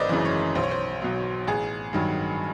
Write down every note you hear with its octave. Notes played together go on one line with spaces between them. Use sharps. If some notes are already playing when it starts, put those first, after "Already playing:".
Already playing: G#1 B4 C5 D5 D#5
F#2 C#3 E3
C#5
B1 C5
C#5
C5
B2 F#3
A1 G#4
G2 D#3 F#3